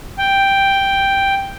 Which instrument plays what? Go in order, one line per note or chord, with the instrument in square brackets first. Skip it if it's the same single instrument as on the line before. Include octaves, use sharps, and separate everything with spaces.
[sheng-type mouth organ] G5